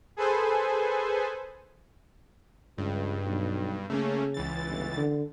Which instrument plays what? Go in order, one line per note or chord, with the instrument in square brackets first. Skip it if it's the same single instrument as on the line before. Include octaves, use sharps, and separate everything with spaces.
[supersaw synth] G#4 A4 B4 C5 G#5
[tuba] C#2 [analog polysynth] G2
[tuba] B1
[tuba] C#3 [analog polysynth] A3 A#3 C#4
[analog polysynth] C#2 E3 A6
[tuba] G1
D3